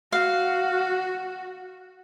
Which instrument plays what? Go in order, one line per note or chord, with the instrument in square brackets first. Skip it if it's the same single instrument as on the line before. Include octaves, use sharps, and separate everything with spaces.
[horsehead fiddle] F#4 [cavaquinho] F5